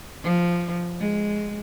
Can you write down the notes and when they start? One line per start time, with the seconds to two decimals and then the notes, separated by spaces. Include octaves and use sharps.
0.24 F3
1.00 G#3